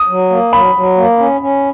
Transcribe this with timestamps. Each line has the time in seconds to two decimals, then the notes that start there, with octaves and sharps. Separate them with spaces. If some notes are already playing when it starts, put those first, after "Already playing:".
Already playing: D#6
0.08 F#3
0.30 A#3
0.52 F#3 B5
0.75 F#3
0.97 A#3
1.18 C#4
1.41 C#4